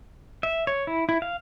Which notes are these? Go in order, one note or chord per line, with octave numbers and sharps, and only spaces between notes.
E5
C#5
E4
E4
F5